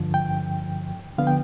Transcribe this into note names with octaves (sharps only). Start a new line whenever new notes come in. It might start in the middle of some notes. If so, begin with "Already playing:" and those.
Already playing: G2 D3 F3
G5
D3 F3 B3 F5
G5